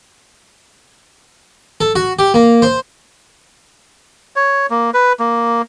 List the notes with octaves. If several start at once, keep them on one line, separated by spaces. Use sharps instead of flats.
A4
F#4
G4
A#3
C5
C#5
A#3
B4
A#3